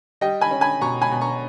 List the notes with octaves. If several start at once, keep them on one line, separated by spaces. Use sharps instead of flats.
G3 D#5 G5
G#5 B5
C#4
G#5 B5
B2 A#5 C#6
G#5 B5
B2
A#5 C#6